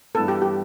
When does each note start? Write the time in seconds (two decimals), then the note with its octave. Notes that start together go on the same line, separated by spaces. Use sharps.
0.15 G2 E3 B3 A4
0.28 G4
0.42 G4